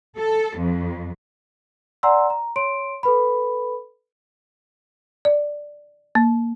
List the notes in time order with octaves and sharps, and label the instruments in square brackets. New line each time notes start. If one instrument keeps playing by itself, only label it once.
[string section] A4
F2
[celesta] D5 F#5 G#5 A#5 C6 E6
A#5
C#5 C6 D7
A4 B4 B5
[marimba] D5
A#3